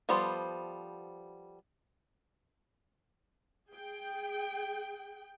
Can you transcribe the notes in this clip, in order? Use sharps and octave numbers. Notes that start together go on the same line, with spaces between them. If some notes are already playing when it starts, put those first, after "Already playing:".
F3 G3 B3 A4 C5
G#4 G5